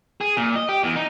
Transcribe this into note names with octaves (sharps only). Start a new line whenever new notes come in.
G#4
A#2
D#5
G4
E2
D#4